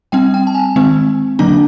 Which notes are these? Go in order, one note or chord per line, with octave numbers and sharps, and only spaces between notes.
G3 C4 G5
G5
A5
G#5
D#3 G#3 C4
D3 F#3 A#3 D4 A#5